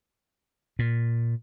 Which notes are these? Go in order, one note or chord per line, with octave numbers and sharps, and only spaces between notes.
A#2